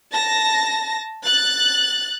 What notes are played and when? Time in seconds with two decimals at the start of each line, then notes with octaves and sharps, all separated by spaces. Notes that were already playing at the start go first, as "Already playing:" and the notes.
0.12 A5 A#6
1.24 F#6 A6